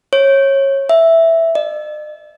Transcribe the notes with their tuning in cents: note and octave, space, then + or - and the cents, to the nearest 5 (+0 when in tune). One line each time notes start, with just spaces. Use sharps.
C#5 -25
E5 +0
D#5 -45